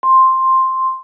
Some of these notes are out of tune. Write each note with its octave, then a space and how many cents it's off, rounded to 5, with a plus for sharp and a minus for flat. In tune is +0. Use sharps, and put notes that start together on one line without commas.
C6 +5